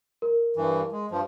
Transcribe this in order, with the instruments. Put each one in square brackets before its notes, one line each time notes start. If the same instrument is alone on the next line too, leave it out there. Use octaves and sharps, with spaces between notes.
[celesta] A#4
[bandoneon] G2 E3
G#3
G2 F3